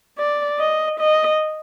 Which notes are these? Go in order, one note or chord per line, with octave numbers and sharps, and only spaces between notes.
D5
D#5
D#5